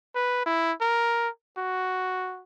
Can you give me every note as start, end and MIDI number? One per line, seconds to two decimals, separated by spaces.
0.15 0.42 71
0.46 0.73 64
0.81 1.29 70
1.58 2.43 66